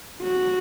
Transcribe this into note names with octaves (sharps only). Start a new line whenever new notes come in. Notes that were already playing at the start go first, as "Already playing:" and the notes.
F#4